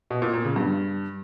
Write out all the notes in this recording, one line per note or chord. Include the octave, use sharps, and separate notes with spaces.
B2
A#2
A#2
C#3
G2